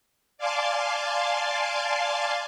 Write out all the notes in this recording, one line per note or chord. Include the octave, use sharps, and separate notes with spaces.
D5 F5 G#5 A5 C6 D6